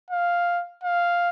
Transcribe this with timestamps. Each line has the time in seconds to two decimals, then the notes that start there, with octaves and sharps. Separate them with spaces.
0.10 F5
0.84 F5